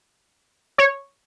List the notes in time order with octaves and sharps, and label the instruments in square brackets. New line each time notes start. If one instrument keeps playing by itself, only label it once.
[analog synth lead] C#5